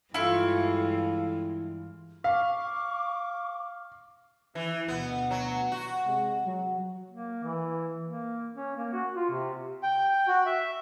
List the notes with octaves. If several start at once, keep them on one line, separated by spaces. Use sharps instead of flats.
G2 E3 G#3 E4 F4 A4 F5 C#6
F5 C#6 D6
E3 E4
D2 B2 B3
F#3
F#4
C3 G#3
F#3
A#3
E3
A#3
C#4
A#3
F#4
F4
C3
G5
F#4
E5